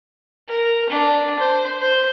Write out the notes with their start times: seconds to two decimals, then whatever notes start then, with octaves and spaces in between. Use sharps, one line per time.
0.48 A#4
0.89 D4
1.39 C5
1.81 C5